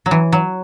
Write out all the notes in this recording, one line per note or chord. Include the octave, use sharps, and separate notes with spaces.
F#3
E3
F#3